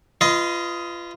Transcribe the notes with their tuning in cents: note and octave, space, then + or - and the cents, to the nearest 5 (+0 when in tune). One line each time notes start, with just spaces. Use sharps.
F4 -20 B4 +20 D#5 +10